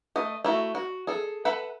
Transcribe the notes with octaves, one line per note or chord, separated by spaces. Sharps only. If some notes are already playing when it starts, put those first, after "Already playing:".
A3 D#5
A3 E4 F#4
F#4
G#4 A4
A4 B4 E5 F#5 B5